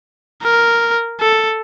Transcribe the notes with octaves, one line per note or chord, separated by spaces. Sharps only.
A#4
A4